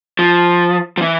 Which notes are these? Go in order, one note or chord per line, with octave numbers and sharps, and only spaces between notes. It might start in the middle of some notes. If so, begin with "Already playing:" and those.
F3
F3
E3